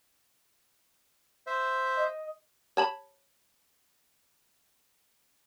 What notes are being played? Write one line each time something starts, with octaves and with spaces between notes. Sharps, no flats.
C5 E5
D#5
C#5 A5 B5